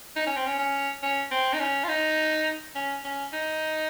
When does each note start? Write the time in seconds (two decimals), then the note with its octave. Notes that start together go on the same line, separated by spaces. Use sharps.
0.16 D#4
0.26 C#4
0.36 C4
0.46 C#4
0.59 C#4
1.02 C#4
1.31 C4
1.53 D#4
1.60 C#4
1.83 F4
1.88 D#4
2.75 C#4
3.04 C#4
3.33 D#4